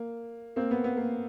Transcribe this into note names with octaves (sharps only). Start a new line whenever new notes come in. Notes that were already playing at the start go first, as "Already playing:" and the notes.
Already playing: A#3
A#3 C4
B3
B3
A#3